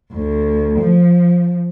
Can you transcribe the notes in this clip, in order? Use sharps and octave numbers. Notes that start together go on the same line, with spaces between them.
D2
F3